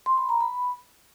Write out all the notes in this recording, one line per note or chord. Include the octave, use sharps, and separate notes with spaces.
C6
B5
A#5
B5